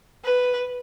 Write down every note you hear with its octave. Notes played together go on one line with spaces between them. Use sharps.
B4